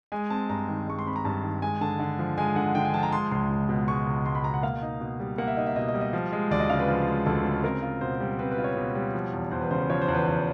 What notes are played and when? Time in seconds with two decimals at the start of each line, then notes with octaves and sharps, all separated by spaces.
0.12 G#3 G#5
0.30 C4 A5
0.49 G2 A#5
0.69 D#3
0.87 G#3 C#6
0.99 C6
1.06 C4 B5
1.16 A#5
1.25 G2 A5
1.43 D#3
1.62 G#3 G#5
1.81 D3 A5
2.00 D3
2.19 F3
2.38 G#3 G#5
2.56 D3 F#5
2.75 D3 G5
2.85 G#5
2.94 F3 A5
3.03 A#5
3.12 G#3 C6
3.31 C#2 C6
3.50 C#2
3.69 B2
3.88 G#3 C#6
4.07 C#2
4.26 C#2 C6
4.35 B5
4.44 B2 A#5
4.54 F#5
4.63 A#3 F5
4.82 D#4
5.01 B2
5.20 G3
5.38 A#3 F#5
5.48 E5
5.57 D#4 D#5
5.67 E5
5.76 B2 D#5
5.88 D#5
5.94 G3
6.01 D#5
6.13 F3
6.32 G#3
6.51 D2 D5
6.60 D#5
6.70 C#3 F5
6.79 B4
6.88 F3
7.08 G#3
7.26 D2 A4
7.45 C#3
7.64 C4 A#4
7.82 F4
8.01 B2 C5
8.20 G3
8.39 C4 B4
8.52 B4
8.58 F4
8.64 C#5
8.77 B2
8.95 G3
9.14 F3
9.33 E2
9.51 E2 C5
9.61 B4
9.71 C#3 C5
9.90 F3 C#5
10.02 C5
10.08 E2
10.15 B4
10.27 E2